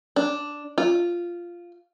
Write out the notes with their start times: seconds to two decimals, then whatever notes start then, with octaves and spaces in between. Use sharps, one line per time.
0.16 D4
0.78 F4